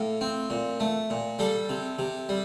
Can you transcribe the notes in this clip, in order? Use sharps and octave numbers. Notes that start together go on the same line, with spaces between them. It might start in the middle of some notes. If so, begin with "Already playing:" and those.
Already playing: A2 F5
C4
A#2
A3
A#2
G3 A4
C3
C3
G3